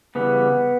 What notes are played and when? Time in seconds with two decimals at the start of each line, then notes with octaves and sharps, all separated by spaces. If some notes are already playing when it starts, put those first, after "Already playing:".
0.15 C#3 E3 G3 B3